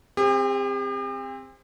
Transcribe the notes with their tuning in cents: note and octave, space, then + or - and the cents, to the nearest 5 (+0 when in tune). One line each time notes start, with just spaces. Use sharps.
C4 +0 G4 +45